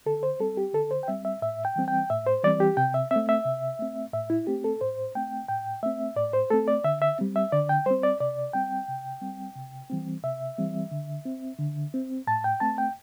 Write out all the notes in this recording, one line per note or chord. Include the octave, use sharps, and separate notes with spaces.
D3 A4
C5
G3 C4 A4
G4
D3 A4
C5
G5
G3 C4 E5
E5
A2 E5
G5
E3 G3 C4
G5
A2 E5
C5
E3 G3 C4 D5
G4
C3 G5
E5
C4 E5
A3
E5
C3
A3 C4
A2 E5
E4
A3 C4 G4
A4
A2 C5
A3 C4 G5
A2 G5
A3 C4 E5
A2 D5
C5
A3 C4 A4
D5
D3 E5
E5
G3 C4
E5
D3 D5
G5
G3 C4 C5
D5
C3 D5
G3 C4 G5
C3
G3 C4
C3
E3 G3 C4
C3 E5
E3 G3 C4
D3
C4
D3
C4
A2 A5
G5
A3 C4 A5
G5